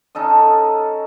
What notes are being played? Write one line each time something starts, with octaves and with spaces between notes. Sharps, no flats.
C#4 D#4 A4 D#5